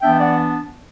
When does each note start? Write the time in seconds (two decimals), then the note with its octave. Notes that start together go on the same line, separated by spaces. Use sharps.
0.01 E3 B3 D4 E5 G5
0.13 E5
0.20 D5 F#5